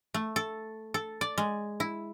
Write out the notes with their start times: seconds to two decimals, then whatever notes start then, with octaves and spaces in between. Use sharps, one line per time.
0.14 A3
0.36 A4
0.94 A4
1.21 D5
1.38 G#3
1.80 E4